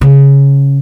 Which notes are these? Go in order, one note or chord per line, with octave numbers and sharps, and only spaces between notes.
C#3